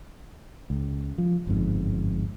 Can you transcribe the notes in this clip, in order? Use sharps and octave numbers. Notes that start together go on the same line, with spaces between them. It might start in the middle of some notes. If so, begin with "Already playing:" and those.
C#2
F3
G1 F2 G#2